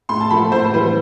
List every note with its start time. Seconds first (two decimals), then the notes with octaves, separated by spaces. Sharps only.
0.09 A2 C6
0.20 A5
0.30 F3 A3 B5
0.52 A2 C5
0.74 E3 G3 B4